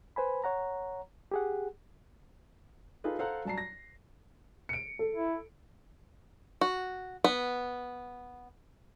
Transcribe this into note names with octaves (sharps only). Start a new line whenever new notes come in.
B4 C5 G#5 B5
C#5 F#5 A#5
G4 G#4 F#5
D#4 F4 G#4 A4 B4
A4 C5 F5 F#5 A#5 F#6
F#3 G3 A5 A#5 C7
A#6
C#7 D7
A4
E4
F#4
B3